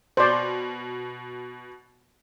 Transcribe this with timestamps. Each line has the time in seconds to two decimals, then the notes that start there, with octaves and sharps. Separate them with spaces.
0.17 B2 C5 D5